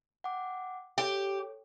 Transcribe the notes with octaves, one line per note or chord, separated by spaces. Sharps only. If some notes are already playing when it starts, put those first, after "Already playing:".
F#5 G5 D6
G4 A4 C#5